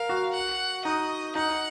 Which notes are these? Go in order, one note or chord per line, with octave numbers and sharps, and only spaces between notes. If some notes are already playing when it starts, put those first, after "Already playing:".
Already playing: A#4 F5
F#4
F#5
D#4 D#5
D#4 F#5